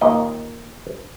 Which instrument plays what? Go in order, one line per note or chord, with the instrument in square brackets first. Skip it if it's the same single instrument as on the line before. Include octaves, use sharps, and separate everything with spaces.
[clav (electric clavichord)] D#2 A#2 D#5